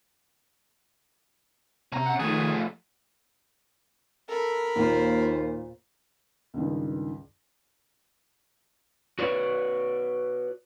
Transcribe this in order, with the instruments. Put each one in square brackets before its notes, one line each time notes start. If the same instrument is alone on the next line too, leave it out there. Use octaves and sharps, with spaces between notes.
[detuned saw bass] C3 [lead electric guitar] C#4 A#5
[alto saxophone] F#5
[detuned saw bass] D#3 [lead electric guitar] F3 A3 [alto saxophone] G#4
[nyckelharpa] A4 [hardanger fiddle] A#4 B5
[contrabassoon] D#2 [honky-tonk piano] A#2 [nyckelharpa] F4 C5
[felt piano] C#2 G2 D#3
[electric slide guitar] F#4 B4 C#5 D5